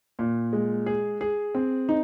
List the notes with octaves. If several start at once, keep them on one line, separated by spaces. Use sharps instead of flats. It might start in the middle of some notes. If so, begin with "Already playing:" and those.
A#2
G#3
G#4
G#4
C4
D#4